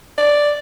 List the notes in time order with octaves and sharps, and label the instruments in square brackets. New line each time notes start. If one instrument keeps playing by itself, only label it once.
[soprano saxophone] D5